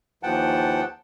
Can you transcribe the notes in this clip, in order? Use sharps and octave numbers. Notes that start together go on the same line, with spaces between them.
D#2 E3 F3 F#5 G5 A5